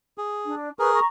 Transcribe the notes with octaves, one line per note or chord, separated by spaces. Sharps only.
G#4
D4
G#4 A#4 B4 C#6
A#5 C#6